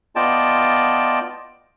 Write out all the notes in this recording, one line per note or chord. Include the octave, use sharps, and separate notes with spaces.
B3 F4 D5 D#5 G5 A5